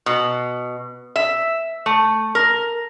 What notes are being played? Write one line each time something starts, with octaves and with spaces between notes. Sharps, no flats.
B2
E5
A3
A#4